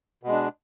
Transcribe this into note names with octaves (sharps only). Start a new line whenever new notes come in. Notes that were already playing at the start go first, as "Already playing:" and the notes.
B2 G#3 D4